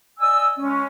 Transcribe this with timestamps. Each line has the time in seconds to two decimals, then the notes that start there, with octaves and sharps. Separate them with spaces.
0.19 D5 D#5 G#5 E6
0.58 G#3 C#4